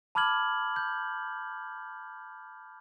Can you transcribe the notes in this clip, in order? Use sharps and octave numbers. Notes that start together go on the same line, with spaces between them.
A5 B5 D6 F6 G#6 F#7
G6